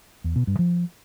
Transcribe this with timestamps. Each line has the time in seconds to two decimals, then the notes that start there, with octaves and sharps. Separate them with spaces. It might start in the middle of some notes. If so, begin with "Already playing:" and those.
0.24 E2
0.36 B2
0.47 G2
0.59 F3